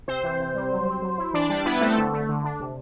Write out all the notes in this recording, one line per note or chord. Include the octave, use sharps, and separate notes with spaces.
C3 C4 C5
E3
C3
G3
F#3
C4
F#3
E4
E3 D4 D5
G3 D4 D5
B3 E4 B4
A3 C4 A4
D3
A3
D3
D4
C3